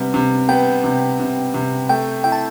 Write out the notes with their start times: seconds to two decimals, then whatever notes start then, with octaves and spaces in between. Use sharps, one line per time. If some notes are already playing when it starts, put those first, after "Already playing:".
Already playing: C3 G3 B3
0.14 C3
0.49 B3 G5
0.84 C3
1.20 C3
1.54 C3
1.89 A3 G5
2.24 E4 G5
2.32 A5